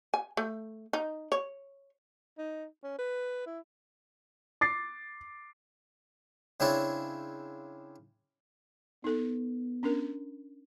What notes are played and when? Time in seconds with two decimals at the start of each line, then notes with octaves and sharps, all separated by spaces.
0.14 G#5
0.37 A3
0.93 D#4
1.32 C#5
2.38 D#4
2.83 C#4
2.98 B4
3.46 E4
4.61 D6 A6 C7
6.60 C#3 C4 D4 E4 C#5 D5
9.04 B3 D#4 A4
9.83 C#4 D4 A#4